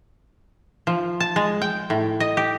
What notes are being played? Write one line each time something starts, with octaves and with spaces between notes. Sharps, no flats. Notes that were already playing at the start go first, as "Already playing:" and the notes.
F3
A5
G#3
G5
A2
D#5
G4